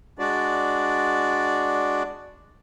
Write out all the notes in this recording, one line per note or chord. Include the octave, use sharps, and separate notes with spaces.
G#3 D4 F#4 D5